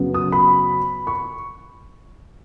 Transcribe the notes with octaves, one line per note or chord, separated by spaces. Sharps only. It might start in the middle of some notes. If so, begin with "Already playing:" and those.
Already playing: F#2 C#3 F#3 B3
D#6
B5
C#6